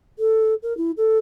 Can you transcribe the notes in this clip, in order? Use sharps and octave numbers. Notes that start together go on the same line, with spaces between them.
A4
A#4
E4
A4